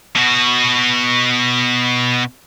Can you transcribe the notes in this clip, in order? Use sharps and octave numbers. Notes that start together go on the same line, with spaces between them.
B2 F#4